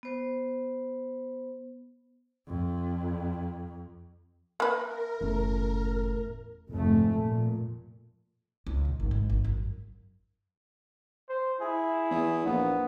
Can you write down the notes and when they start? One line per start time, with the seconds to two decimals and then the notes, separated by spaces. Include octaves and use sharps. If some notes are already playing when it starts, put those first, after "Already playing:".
0.03 B3 C5
2.48 F2
4.60 A#3 A#4 B4 E5
5.21 F#1 E2 A2 A3 C#4
6.69 F1 G#2 A3
7.16 A#2
8.67 C#2
8.85 A#1
9.00 G#1
9.11 G#2
9.30 G#1
9.44 F#2
11.29 C5
11.61 E4 G#4
12.10 E2
12.45 A#1 B3